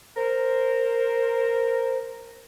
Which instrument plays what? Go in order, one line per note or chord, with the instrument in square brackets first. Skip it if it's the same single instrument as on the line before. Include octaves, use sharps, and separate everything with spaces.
[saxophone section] A#4 [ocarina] C5